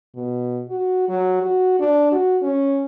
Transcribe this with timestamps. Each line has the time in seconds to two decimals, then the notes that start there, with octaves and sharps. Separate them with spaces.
0.15 B2
0.69 F#4
1.09 F#3
1.42 F#4
1.80 D4
2.12 F#4
2.42 C#4